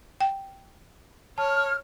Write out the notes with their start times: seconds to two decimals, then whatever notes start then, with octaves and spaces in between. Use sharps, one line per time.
0.21 G5
1.38 C#5 A5 F6